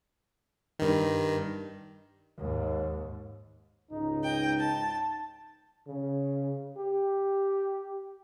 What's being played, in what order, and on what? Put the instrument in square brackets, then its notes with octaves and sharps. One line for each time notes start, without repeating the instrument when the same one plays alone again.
[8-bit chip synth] G2 D#3
[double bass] D#2 G#2
[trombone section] C#2 G#2 D#4
[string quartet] D#5 G5
A5
[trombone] C#3
G4